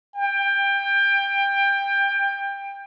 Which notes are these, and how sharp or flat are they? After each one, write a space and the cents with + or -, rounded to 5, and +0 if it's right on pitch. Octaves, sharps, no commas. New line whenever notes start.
G5 +20